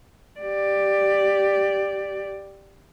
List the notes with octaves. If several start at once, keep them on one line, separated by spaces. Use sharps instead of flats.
G4 D5